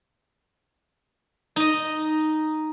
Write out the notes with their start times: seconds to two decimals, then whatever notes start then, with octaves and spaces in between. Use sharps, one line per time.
1.56 D#4 D#5